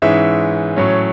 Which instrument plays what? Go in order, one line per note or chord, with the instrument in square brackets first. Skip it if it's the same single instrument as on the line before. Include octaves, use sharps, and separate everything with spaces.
[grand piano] G#2 E3 G#3 C#4 E5
A2 F#3 C#4